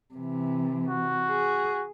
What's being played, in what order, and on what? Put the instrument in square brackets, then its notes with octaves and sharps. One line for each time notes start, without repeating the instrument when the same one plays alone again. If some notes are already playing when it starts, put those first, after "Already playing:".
[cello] C3 E3
[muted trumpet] F#4
[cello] G#4